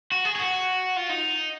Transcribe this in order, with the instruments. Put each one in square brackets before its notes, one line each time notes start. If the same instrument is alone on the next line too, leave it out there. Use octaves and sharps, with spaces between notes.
[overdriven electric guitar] F#4
G#4
G#4
F#4
F4
D#4